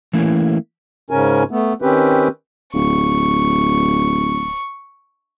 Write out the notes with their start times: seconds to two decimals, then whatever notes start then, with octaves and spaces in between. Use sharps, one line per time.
0.13 E3 A3 A#3 C#4 E4
1.10 G#2 C#3 C#4 A#4 G#5
1.51 A3 B3
1.82 D#3 C4 C#4 G4 B4
2.74 D1 C#6